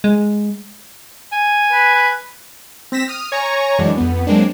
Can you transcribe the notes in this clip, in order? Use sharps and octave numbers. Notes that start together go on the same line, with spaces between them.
G#3
G#5
B4
B4
C4 A#6 B6 E7
D#6 F6
C#5 G#5 A#5 C#6
F#2 E3 F#3 G#3 D4
F2 B3
F#3 G#3 A#3 C4 D4